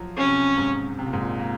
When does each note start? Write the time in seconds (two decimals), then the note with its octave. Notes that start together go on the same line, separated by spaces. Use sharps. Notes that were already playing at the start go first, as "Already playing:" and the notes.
Already playing: F3 F#3
0.17 C3 C#4
0.57 G#2
0.99 C3
1.06 A#2
1.13 G#2
1.21 A#2
1.39 A#2